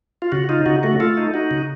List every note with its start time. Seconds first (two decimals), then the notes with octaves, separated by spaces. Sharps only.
0.22 F4
0.32 C#3 F#4
0.49 D#4 F4
0.66 C#3 F#4
0.83 A3 F#4
1.00 A3 F4 A4
1.17 D#4
1.34 D#4 F#4
1.51 C#3